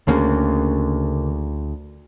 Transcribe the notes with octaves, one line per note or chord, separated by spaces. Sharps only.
D2 C#3 A#3